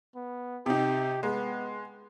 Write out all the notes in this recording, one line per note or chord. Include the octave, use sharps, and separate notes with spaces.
B3
C3 D#4 G4
G#3 B3